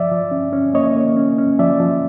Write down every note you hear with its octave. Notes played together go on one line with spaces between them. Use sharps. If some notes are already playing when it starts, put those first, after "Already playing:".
Already playing: F3 D5 E5
F3
C#4
C#4
A#3 C#5 D#5
A#3
C#4
C#4
F3 D5 E5
F3